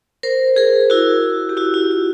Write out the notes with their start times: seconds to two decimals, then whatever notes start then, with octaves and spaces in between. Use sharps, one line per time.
0.23 A#4 C5
0.56 G#4 A#4
0.90 E4 F#4
1.49 G4
1.57 E4 F#4
1.74 E4
1.91 F4